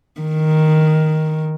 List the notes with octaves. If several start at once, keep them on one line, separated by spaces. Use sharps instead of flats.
D#3